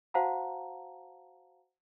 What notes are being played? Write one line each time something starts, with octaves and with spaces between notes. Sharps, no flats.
F#4 C5 F5 F#5 A5 A#5